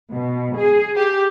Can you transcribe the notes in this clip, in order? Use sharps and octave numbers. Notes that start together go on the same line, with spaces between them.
B2
G#4
G4